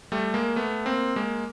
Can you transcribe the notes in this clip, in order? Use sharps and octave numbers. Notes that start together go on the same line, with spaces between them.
G3 A3
G#3 A#3
A3 B3
A#3 C4
G#3 A#3